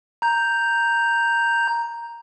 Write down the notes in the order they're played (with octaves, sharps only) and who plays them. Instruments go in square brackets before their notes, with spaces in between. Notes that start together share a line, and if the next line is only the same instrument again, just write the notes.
[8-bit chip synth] A#5 G6